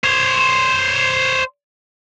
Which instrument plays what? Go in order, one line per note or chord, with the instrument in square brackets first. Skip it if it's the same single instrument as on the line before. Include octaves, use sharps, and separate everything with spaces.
[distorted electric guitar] C5 C#5